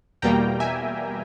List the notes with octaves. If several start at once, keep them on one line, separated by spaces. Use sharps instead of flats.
E2 B2 G3 A#3 G5 A#5
E5 G#5